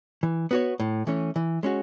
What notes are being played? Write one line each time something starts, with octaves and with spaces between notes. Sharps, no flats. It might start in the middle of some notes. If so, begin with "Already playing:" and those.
E3
B3 F#4 C#5
A2
E3 A3 C#4
E3
G#3 C#4 F#4